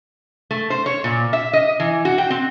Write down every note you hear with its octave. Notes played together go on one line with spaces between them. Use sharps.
A3
C5
C#5
A#2
E5
D#5
E3
F#4
G5
C4